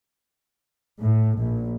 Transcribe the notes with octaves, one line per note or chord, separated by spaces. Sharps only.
A2
A#1